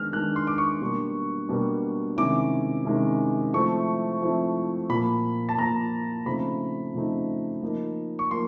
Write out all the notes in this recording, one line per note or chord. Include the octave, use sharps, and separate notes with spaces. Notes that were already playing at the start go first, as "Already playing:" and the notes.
Already playing: D#3 G#3 B3 D4 F6
D#3 G#3 B3 D4 F#6
C6
D6
C#6
B2 G3 A#3 D4
B2 G3 A#3 D4
C3 D#3 G#3 C#4 E4 D6
C3 D#3 G#3 C#4 E4
F3 A3 C4 E4 C#6
F3 A3 C4 E4
A#2 F3 A#3 B5
A5
A#2 F3 A#3 A#5
C#3 F3 A3 C4 D#4 B5
C#3 F3 A3 C4 D#4
F3 A#3 D#4
C#6
F3 A#3 C6